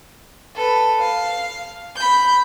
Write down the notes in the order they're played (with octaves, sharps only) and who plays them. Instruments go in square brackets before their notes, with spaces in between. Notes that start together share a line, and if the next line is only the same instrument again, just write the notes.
[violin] A4 B4
F5
B5 G6